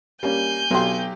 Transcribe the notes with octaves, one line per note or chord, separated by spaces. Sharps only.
G3 A#3 C#4 G#5 G6
B1 F#3 G4 C6